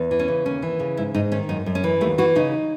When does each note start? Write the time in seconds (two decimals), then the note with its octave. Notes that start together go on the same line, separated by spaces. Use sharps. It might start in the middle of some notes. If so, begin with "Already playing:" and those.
Already playing: E2
0.11 E3
0.19 C#4
0.28 C#3
0.45 D#2 C#4
0.62 E3
0.80 C#3
0.97 G#2 E4
1.14 G#2 D#4
1.32 D#3 C#4
1.49 F#2 D#4
1.66 F#2
1.75 C#4
1.84 E3
2.01 D#2 A3
2.18 E3 F#4
2.35 C#3 D#4